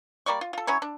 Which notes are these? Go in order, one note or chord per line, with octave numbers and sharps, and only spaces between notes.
G3 A#3 D5 C#6
F4
F4 A4
F#3 C#4 E4 C#5
D4